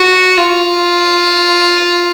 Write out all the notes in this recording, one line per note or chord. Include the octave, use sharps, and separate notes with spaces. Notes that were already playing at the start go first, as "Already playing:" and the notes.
Already playing: F#4
F4